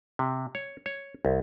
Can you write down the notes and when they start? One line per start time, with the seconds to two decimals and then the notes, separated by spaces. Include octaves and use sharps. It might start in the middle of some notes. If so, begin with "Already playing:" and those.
0.19 C3
0.55 C#5
0.86 C#5
1.25 C2